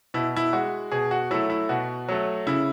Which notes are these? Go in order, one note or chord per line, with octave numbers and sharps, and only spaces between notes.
B2 E4
E4
G#3 F#4
B2 G#4
F#4
F#3 A3 E4
E4
B2 F#4
F#3 A3
C#3 E4